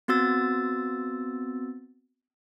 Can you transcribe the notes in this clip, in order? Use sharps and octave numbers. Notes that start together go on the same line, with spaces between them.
B3 C4 F#4 E6 A6